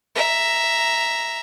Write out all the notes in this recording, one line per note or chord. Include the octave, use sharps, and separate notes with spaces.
E5 A#5